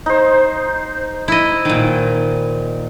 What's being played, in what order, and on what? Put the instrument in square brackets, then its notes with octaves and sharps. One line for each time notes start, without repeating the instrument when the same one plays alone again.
[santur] D#4 C5
[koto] E4 D#5
A#2 D#3